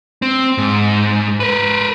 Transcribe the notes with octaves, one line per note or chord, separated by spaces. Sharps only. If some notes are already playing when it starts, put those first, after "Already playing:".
C4
G#2
A#4 B4